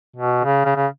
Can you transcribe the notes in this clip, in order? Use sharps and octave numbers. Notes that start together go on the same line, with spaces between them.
B2
C#3
C#3
C#3